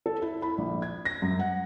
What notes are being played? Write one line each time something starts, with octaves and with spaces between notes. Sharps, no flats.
A4
E4
B5
A#1
G#6
A#6
F#2
F#5